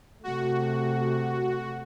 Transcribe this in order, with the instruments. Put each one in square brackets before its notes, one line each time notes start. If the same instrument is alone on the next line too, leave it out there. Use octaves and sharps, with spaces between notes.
[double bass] C3 A3 [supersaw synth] F#4